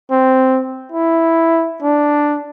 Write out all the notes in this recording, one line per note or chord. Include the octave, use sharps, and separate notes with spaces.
C4
E4
D4